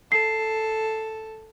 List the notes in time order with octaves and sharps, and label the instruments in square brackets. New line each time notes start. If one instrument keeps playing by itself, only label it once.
[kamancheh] A4 [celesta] C7